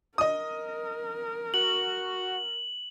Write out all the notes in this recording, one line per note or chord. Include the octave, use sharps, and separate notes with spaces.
A#4 D#5 D#6
F#4 F#7